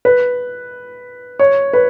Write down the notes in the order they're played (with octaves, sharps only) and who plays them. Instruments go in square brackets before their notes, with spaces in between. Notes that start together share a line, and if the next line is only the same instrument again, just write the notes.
[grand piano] B4
C#5
B4